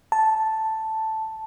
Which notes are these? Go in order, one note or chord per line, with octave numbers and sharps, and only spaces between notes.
A5